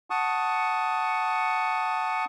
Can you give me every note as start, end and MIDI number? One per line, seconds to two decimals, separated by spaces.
0.10 2.25 78
0.10 2.25 81
0.10 2.25 85
0.10 2.25 87